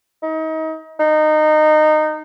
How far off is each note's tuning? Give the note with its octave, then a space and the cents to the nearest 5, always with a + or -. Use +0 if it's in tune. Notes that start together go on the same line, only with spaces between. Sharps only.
D#4 +35
D#4 -20